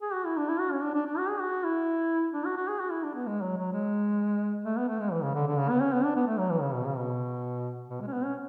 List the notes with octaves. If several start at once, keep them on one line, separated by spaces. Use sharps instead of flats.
G#4
F#4
E4
D4
E4
F#4
C#4
D4
D4
D4
F#4
G#4
F#4
E4
D4
F#4
F#4
G#4
F#4
E4
D4
B3
G#3
F#3
F#3
G#3
A3
B3
A3
G#3
E3
C#3
D3
D3
C#3
B3
C#4
B3
D4
B3
A3
F#3
E3
C#3
B2
C#3
B2
B2
G#3
C#4
B3
C#4